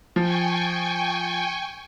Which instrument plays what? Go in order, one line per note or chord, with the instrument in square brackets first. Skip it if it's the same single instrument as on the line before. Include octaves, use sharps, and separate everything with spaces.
[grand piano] F3 [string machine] G5 G#5 C#6